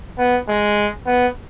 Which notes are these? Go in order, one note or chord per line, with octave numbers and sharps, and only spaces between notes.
B3
G#3
B3